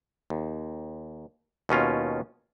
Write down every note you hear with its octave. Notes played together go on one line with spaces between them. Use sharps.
D#2
D#2 B2 C#4 F4